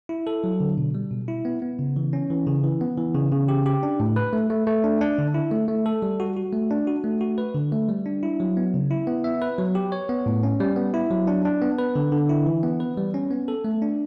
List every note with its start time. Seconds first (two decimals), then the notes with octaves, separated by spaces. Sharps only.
0.09 E4
0.27 A4
0.44 F#3
0.60 D3
0.78 B2
0.95 G3
1.11 B2
1.28 E4
1.45 B3
1.62 B3
1.79 C#3
1.96 E3
2.13 C#4
2.30 E3
2.47 C#3
2.64 E3
2.81 B3
2.97 E3
3.15 C#3
3.32 C#3
3.49 G4
3.66 G4
3.83 D4
4.00 A2
4.16 B4
4.33 A3
4.50 A3
4.67 A3
4.84 D4
5.01 D4
5.18 D3
5.34 E4
5.52 A3
5.68 A3
5.86 A4
6.02 G3
6.20 F#4
6.36 F#4
6.53 A3
6.71 D4
6.87 F#4
7.04 A3
7.21 F#4
7.38 B4
7.55 D3
7.72 A3
7.89 G3
8.06 D4
8.23 E4
8.40 F#3
8.57 B3
8.74 C#3
8.91 E4
9.07 B3
9.24 E5
9.42 B4
9.58 F#3
9.75 G4
9.92 C#5
10.09 B3
10.26 A2
10.43 C#4
10.60 G3
10.76 B3
10.94 E4
11.11 F#3
11.27 D4
11.45 D4
11.62 B3
11.79 B4
11.96 D3
12.12 D3
12.29 E4
12.46 E3
12.63 B3
12.80 B4
12.97 G3
13.14 C#4
13.31 B3
13.48 A4
13.65 A3
13.82 D4